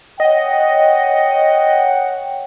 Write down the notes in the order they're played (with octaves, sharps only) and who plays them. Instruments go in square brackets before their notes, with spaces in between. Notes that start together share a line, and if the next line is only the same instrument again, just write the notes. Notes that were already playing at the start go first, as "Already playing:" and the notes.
[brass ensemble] C#5 F#5 G5 [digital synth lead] D#5